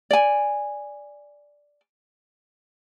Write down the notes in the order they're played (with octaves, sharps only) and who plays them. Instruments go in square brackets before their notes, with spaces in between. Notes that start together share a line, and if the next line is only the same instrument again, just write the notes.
[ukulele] D5 G#5